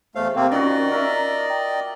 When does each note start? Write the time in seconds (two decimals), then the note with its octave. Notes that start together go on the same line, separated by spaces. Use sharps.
0.15 E2 A3 C5 F5
0.36 C3 A#3 C4 F5
0.52 D#3 C#4 F4 F#4 D5 D#5
0.92 A#4 E5 A#5
1.50 G5